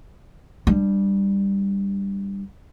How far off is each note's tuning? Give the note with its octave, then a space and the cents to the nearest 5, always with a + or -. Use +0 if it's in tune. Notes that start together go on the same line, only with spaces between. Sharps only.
G3 +10 D4 +15